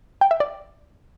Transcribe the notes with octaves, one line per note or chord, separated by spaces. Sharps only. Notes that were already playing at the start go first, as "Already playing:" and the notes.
G5
E5
D5